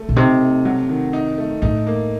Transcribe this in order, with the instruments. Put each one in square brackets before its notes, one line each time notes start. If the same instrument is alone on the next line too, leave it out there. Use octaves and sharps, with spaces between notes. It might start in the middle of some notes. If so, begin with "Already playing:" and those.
Already playing: [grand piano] A3
[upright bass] A#2
[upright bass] C3 [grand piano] D#4
[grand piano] A3
F#3
D#3
D#4
A3
[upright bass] A2 [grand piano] D#4
[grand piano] A#3